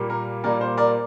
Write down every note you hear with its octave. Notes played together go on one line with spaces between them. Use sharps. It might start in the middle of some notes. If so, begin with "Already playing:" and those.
Already playing: A#2 G3 A#3
A#4
A#2 G3 A#3 A#4 D5
C5
A#4 D5